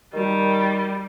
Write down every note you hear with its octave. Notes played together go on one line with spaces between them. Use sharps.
D#3 G3